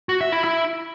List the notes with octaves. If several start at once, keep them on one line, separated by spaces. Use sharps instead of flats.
F#4
E5
E4
E4